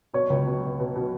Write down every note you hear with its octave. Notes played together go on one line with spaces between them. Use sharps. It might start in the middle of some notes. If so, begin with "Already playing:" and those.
B2 C#5
C#2
B2
B2
B2
B2